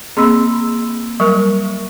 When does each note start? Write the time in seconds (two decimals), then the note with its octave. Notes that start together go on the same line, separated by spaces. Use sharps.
0.17 A#3 C4 G#4 D#5 B5 E6
1.20 F#3 G3 A#4 C#6